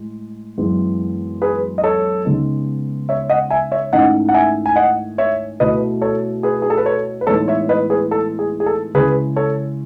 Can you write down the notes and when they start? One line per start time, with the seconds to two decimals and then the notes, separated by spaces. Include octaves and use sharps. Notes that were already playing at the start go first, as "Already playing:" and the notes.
Already playing: A2 G#3
0.58 F#2 E3 G#3 B3 E4
1.42 G#4 B4
1.78 D#5
1.84 A4 C#5
2.25 C#3 G#3 B3 D#4
3.09 C#5 E5
3.30 D#5 F#5
3.50 E5 G#5
3.72 C#5 E5
3.92 G#2 D#3 A3 C#4 E4 D#5 F#5
4.29 F#5
4.34 E5 G#5
4.66 G#5
4.76 D#5 F#5
5.18 C#5 E5
5.60 B2 A3 E4 B4 D#5
6.01 A4 C#5
6.43 G#4 B4
6.62 G#4
6.70 A4
6.77 B4
6.86 A4 C#5
7.21 B4
7.27 A2 E3 G#3 B3 D#4 A4 C#5
7.48 C#5 E5
7.69 B4 D#5
7.90 G#4 B4
8.11 A4
8.39 G#4
8.60 G#4
8.66 A4
8.94 C#3 G#3 C#4 E4 G#4 B4
9.36 A4 C#5